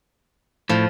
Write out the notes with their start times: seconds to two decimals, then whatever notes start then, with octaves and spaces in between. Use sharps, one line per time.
0.69 A2 F3